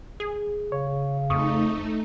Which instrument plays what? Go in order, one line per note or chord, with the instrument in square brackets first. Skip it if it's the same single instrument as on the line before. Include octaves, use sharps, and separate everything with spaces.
[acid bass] G#4
[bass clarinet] C#3 [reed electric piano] C#5
[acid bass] F2 [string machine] A3 D#4 [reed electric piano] C#6 D#6